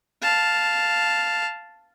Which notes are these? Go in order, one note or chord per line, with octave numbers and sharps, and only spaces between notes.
F5 A5